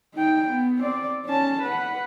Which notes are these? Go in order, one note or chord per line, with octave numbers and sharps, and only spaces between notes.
D#4 G5
B3
C4 D5
C#4 A5
B4 F#5